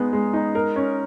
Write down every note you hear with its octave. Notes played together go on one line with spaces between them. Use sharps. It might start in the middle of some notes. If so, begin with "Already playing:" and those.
Already playing: G#3 B3 D#4 G#4
G#3
D#4
A#4
C#4